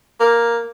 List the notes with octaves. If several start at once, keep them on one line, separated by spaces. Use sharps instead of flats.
A#3